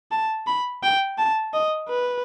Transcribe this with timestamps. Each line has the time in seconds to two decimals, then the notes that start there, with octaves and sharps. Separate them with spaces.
0.11 A5
0.47 B5
0.83 G5
1.18 A5
1.54 D#5
1.90 B4